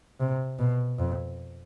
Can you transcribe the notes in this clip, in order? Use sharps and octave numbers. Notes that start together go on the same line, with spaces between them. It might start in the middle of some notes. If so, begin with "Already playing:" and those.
C3
B2
F2